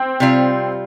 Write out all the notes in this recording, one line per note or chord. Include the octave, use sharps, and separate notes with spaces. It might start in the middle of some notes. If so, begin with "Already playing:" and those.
Already playing: C4
C3 G3 F4